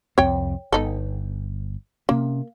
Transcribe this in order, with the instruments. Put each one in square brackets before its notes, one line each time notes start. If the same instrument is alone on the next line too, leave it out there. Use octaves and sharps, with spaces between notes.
[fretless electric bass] C2 F2 C4 [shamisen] C#5 G5
[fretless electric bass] G1 [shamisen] B3 D#4 A4
[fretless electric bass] C3 C#4 [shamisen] A#3